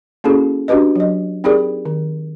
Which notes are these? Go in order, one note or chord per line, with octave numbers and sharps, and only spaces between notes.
A#3 C#4 E4 F#4 G#4 A4
D4 F#4 G4 B4 D#5
F#3 D#5
C4 D#4 G4 G#4 A#4 D5
D#3